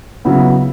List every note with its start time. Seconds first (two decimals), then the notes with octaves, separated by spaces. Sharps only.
0.25 C#3 F#3 B3 E4